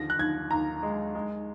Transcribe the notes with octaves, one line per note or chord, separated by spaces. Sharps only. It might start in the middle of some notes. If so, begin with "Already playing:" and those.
Already playing: D#2 D3 F3 A#6
F#6
D#2 G#6
D#2 A#5
G#3
G#3